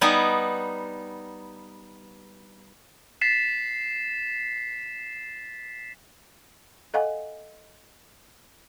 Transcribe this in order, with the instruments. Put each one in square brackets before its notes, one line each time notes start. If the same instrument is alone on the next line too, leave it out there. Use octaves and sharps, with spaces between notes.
[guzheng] G3 B3 D#4 G#5
[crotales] A6 B6 C7 E7
[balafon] A4 D#5 F5 F#5 G#5